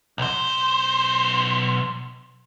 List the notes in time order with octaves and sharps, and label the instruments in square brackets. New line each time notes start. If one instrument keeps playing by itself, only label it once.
[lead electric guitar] B1 C5